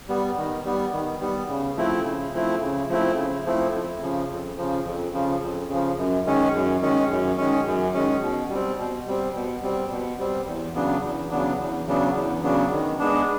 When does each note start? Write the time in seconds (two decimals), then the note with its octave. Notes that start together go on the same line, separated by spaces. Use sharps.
0.08 G3 B3
0.37 D#3
0.65 G3 B3
0.92 D#3
1.21 G3 B3
1.49 C#3
1.77 F3 A3 C4 E4
2.05 C#3
2.33 F3 A3 C4 E4
2.61 C#3
2.89 F3 A3 C4 E4
3.17 C#3
3.46 F3 A3 C4 E4
3.74 F2
4.02 C#3 F3
4.30 F2
4.58 C#3 F3
4.85 F2
5.14 C#3 F3
5.41 F2
5.70 C#3 F3
5.98 F#2
6.26 D#3 G#3 C#4
6.54 F#2
6.82 D#3 G#3 C#4
7.10 F#2
7.38 D#3 G#3 C#4
7.66 F#2
7.94 D#3 G#3 C#4
8.22 B2
8.50 G3 C4
8.78 B2
9.07 G3 C4
9.34 B2
9.63 G3 C4
9.91 B2
10.19 G3 C4
10.46 E2
10.74 C#3 F#3 B3 D4
11.03 E2
11.31 C#3 F#3 B3 D4
11.59 E2
11.87 C#3 F#3 B3 D4
12.15 E2
12.43 C#3 F#3 B3 D4
12.71 D#3
12.99 G#3 B3 D4